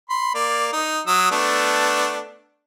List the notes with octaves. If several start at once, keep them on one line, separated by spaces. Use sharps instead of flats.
B5 C6
A#3 D5
D#4
F#3 D#6 E6
A3 B3 D4